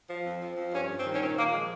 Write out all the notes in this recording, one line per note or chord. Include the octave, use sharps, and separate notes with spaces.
F3
F2
F3
F2
G2 C#4
G2
C4
D#3
C#4
A#2 C4
A#2 A#3
F3 G#3